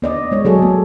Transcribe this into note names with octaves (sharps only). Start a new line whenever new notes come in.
B3 D5 D#5
G#3 C#5
F#3 G#4 A4 C#5
A3 B3